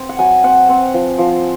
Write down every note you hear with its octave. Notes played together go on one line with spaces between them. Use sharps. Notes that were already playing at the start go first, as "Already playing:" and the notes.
Already playing: C4
F#5
F#3 G#5
C4 F#5
C4
F3
F3